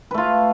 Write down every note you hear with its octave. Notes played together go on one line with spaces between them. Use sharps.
A3 F4 B4